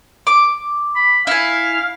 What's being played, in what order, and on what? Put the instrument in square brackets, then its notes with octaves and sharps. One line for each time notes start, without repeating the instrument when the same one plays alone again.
[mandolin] D6
[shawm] B5
[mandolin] E4 G#5 [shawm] F5